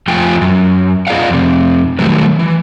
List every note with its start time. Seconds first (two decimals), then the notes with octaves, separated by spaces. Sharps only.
0.08 F2 F3 A3 F4 G5 G#5
0.41 F#2
1.07 F4 G#4 D5 D#5 F5 F#5
1.30 F2 C3
1.99 D#3 F#3 G3 A3 B4
2.39 E3